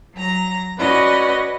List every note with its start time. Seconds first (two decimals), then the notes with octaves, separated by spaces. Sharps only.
0.15 F#3 A#5 A#6
0.79 C#4 F#4 B4 D5 D#5